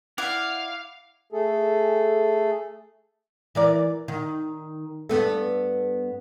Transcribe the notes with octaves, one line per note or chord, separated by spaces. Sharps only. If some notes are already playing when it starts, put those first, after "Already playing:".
E4 D5 F5 F#5
A3 G#4 A4
E3 A#4 D5
D#3
G2 B3 A4